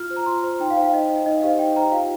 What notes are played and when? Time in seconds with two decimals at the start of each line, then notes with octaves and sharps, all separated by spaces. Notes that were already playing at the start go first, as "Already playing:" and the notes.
Already playing: F4 F6
0.10 C5
0.16 A#5
0.26 F4 C6
0.43 C5
0.60 D#4 G5
0.70 F5
0.77 C5
0.82 F5
0.92 D#4 D#5
1.10 C5
1.26 D#4 D#5
1.42 G4 C5 F5
1.59 D#4 G5
1.76 G4 C5 A#5
1.92 F4 F5